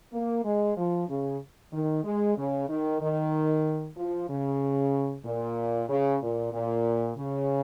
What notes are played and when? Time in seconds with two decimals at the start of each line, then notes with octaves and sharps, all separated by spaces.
0.12 A#3
0.44 G#3
0.77 F3
1.09 C#3
1.73 D#3
2.04 G#3
2.37 C#3
2.69 D#3
3.01 D#3
3.97 F3
4.29 C#3
5.25 A#2
5.89 C#3
6.21 A#2
6.53 A#2
7.17 C#3